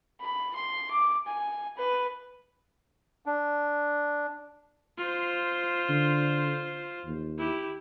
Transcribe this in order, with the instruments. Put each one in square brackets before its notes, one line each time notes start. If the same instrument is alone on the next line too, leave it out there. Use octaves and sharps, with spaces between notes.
[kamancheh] B5
C6
D6
G#5
B4
[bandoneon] D4
[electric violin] F4 C5
[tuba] D3
D#2
[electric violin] E4 G4